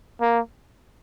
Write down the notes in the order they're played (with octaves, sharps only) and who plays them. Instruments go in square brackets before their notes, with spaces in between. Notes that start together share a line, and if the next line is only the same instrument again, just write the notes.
[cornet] A#3